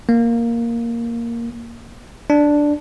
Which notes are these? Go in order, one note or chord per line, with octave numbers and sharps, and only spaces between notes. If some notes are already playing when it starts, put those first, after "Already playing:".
A#3
D4